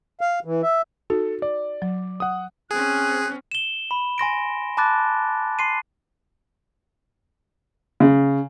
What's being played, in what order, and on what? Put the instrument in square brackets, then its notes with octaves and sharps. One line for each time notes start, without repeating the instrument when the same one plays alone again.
[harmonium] F5
E3
E5
[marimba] D#4 F#4 [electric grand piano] A4
[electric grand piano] D5
[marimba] F#3
[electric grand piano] F#5 D#6
[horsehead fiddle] C4 C#4 [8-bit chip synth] G#4 [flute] F#6
[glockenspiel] E7 G7
B5
G#5 C6 A#6 D7
A5 B5 D6 F#6 A6
C6 C7 D#7
[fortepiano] C#3